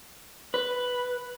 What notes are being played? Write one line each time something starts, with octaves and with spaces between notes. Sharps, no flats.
B4